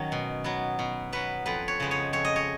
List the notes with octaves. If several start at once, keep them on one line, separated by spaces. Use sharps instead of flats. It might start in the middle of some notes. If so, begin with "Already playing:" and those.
Already playing: D#3 F#3 C#4
B2
F#3 B3
B2
F#3 B3 B4
F2 B4
C#5
C#3 G#3 B3
C#5
F2 C#5
D#5
C#5